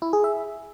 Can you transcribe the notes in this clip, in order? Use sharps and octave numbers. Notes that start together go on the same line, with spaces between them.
E4
G#4
E5